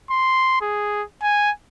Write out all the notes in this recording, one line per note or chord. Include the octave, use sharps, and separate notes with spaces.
C6
G#4
G#5